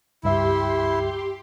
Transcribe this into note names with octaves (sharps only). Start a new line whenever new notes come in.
C#2 G2 E4 G4 E5 C6